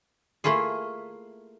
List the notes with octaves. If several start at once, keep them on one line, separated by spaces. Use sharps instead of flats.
A3 A#3 E4 F4 G#4